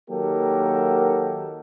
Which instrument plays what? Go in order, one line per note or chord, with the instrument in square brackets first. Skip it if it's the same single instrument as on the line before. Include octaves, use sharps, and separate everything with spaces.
[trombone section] D#3 F#3 A#3 G4 A4 A#4